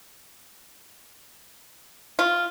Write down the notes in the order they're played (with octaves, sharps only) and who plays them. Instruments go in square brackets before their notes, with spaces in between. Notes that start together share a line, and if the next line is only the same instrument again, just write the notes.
[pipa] F4